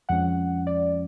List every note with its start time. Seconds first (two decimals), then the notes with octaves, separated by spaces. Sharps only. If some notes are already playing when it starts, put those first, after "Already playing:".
0.09 F2 F3 G#3 C#4 F#5
0.67 D5